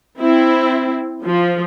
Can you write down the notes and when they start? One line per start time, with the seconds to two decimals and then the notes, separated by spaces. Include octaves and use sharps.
0.20 C4 E4
1.23 F3